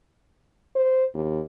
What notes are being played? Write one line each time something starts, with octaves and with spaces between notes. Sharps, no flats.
C5
D#2